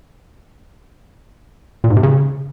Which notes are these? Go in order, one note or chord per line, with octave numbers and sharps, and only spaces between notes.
A#2
G#2
C3
C#3